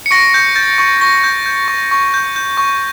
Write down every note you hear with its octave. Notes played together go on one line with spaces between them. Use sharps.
C#7
C#6 A#6 D7
G6
G6 A6
C#6
C#6 A#6
G6
G6
C#6
C#6
G6
G6
C#6